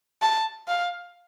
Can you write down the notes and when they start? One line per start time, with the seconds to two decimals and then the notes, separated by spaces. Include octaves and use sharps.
0.22 A5
0.68 F5